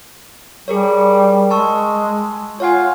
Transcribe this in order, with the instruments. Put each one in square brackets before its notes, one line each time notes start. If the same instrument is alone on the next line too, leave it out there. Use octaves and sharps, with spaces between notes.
[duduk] G3 [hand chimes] G#4 A#4 C#5
[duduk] G#3 [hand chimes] A5 C#6 E6
[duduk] F4 [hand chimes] C#5 F#5 G#5